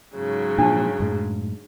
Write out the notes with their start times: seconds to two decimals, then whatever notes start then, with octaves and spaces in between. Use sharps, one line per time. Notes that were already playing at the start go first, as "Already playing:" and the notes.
0.15 G#2 C#3 F#3
0.58 A#2 F3 D4 A5
1.00 F#2 A2 G#3